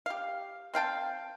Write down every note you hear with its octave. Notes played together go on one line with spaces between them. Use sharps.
G4 F5
C4 F5 G5 A5